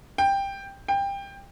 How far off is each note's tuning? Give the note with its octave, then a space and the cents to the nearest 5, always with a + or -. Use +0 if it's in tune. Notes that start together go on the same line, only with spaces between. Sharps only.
G5 +10
G5 +20